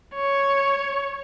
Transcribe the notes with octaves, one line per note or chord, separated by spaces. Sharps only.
C#5